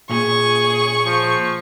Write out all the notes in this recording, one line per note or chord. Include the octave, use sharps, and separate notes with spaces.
A#2 G#4 C#6
F3